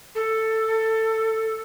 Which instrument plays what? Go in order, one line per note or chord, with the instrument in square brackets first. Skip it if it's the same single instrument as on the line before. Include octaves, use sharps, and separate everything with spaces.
[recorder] A4